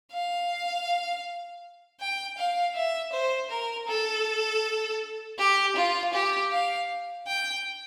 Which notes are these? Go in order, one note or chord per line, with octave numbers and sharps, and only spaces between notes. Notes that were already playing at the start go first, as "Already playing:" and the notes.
F5
G5
F5
E5
C5
A#4
A4
G4
F4
G4
F5
G5